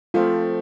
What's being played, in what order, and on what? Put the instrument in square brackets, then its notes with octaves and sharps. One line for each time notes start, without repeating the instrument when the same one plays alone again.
[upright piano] F3 A3 C4 [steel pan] F4